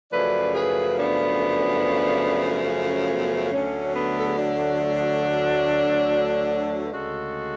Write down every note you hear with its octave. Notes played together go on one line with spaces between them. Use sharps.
F#2 C#3 F3 A3 B4 D5
G#4 B4
B3 D4
C#4
B3
D2 D3 F#3 A3 C#4
B3 D4
A4
G#4
D4 F#4
B4
D2 C#3 G#3 F#4 A4